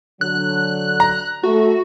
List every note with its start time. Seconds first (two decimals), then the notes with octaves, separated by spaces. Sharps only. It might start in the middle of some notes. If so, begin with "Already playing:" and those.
0.21 D3 F#3 F#6
1.00 A#5
1.43 A3 F#4